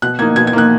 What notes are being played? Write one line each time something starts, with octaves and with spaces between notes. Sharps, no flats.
B2 F#6
A#3 D#4 G#6
B2 G#6
G#6
A#3 D#4 F#6